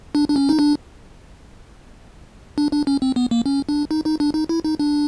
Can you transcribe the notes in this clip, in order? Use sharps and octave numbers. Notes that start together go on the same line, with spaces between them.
D4
D4
C#4
D#4
D4
D4
D4
C#4
C4
B3
A#3
C#4
D4
D#4
D#4
D4
D#4
E4
D#4
D4